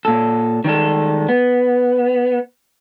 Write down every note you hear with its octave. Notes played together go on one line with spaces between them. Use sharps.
A#2 A4
D#3 G3 G#3 A4
B3